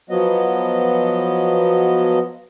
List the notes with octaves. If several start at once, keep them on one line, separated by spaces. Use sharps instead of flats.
F3 F#3 B3 D#5